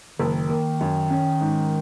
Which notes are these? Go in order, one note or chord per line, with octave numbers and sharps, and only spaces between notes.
F#1 D#3
A#3
F#2
C#4
G#2